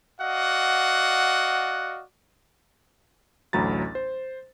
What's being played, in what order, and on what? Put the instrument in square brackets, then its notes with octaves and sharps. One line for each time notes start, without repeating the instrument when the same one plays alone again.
[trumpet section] F#4 D5 D#5 F5 F#5
[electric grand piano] A1 D2 F#3 A#5 B5 A6
C5